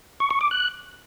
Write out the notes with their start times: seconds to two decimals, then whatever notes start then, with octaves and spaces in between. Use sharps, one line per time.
0.20 C#6
0.31 C#6
0.41 D6
0.51 F#6